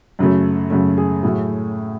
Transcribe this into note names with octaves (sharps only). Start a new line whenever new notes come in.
F#2 C#3 F#3 A3
F#2 C#3 F#3 A3
G#4
A2 F#3 A3 G#4